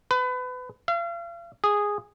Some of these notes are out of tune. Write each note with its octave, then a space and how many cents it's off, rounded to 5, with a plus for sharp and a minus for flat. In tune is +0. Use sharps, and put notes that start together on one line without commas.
B4 +30
F5 -40
G#4 -10